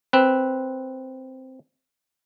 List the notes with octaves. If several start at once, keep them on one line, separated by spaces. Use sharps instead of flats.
C4 B4